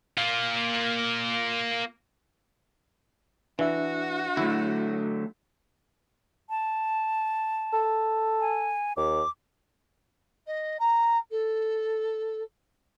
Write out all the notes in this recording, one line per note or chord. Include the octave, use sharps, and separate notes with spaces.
A#3 F4
E3 D4 F#4 E5
D3 F#3 A3 E4
A5
A4
G#5
D#2 D6
D#5
A#5
A4